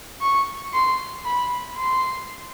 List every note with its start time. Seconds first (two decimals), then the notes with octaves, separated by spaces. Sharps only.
0.21 C#6
0.74 C6
1.25 B5
1.77 C6